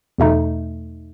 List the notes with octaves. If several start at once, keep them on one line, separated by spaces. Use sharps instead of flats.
E2 B2 A3 D#4